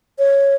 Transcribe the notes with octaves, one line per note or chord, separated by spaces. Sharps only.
C#5